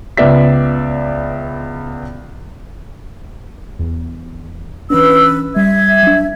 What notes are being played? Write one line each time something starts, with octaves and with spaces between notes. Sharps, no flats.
C#2 B3 D5 E5 B6
E2
E3 C#4 D4 B4 E6
G3 E5 G#6
F#3 D4